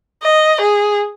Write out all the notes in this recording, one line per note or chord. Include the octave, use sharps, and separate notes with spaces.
D#5
G#4